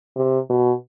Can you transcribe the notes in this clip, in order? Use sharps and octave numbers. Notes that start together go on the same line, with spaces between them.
C3
B2